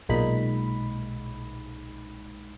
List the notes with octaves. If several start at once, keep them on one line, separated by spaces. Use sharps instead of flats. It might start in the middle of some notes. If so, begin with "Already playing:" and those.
B1 A#2 G#3 D#4 B5